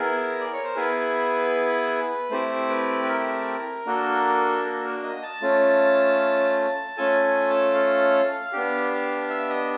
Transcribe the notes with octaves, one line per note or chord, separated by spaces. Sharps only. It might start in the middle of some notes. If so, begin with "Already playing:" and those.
Already playing: B3 E4 G#4 A#4
D5
C#5
C5
B3 E4 G#4 B4
A3 C4 E4 G4 C5
B4
B4
A#4
A#3 D4 F#4 A4
A4
A#4
D#5
A5
A3 C#4 F4
A3 C#4 F4 A4 G#5
G#5
A5
F5
B3 D4 G4
E5
D#5